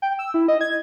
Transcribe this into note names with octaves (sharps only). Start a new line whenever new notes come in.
G5
E6
E4
D#5
G#6